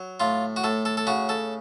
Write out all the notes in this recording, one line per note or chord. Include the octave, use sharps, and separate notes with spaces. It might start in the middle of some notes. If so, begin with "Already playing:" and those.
Already playing: F#3
A2 F4
F#4
A2 A4
A4
A4
C#3 F#4
A4